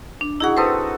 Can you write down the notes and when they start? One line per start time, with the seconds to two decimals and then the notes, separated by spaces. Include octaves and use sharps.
0.21 D4
0.40 D#4 E4 F#4 G#4 F#5
0.57 C4 A4 B4 C5 D#6